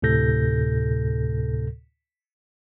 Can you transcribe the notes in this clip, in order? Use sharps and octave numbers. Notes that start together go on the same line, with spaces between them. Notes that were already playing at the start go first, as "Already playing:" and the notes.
D2 A2 C3 A4 G6 A#6